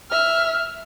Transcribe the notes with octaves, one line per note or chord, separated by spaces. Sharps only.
E5 F6